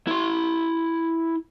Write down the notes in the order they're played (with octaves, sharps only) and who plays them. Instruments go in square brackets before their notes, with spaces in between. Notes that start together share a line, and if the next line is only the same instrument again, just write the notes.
[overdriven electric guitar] E4 C6